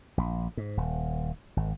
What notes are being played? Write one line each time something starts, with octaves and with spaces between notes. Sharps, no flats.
A#1
G#2
D#1
G#1